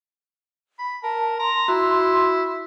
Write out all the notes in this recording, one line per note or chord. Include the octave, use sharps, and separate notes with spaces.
B5
A#4 A5
A#5 C6
E4 F#4